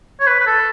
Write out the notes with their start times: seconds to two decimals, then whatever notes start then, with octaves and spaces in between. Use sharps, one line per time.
0.20 C#5
0.27 B4
0.40 B4
0.46 A4